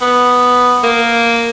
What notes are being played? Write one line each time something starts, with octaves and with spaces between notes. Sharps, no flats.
B3
A#3